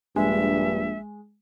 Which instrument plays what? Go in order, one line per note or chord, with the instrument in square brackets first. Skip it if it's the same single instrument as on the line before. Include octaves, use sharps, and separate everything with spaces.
[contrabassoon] A#1 [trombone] G2 [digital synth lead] G#3 [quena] E5